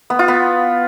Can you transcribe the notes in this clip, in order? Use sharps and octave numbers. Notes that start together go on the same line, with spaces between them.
B3
F4
B3